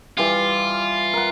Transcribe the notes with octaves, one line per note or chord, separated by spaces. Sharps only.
E3 G3 F4
A#4 F#5